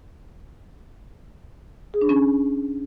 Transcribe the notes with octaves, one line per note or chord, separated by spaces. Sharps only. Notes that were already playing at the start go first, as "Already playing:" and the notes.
G#4
D4
C#4